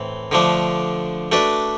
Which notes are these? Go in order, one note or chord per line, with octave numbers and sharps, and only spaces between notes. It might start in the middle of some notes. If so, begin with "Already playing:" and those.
Already playing: A2 E3 C4
D3 F3 A3 D4
A3 D4 F#4 B4 D5